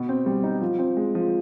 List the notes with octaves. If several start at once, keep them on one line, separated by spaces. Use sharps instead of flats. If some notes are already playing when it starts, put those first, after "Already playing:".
Already playing: B2
C4
G3
D#4
F3
C4
G#3
F3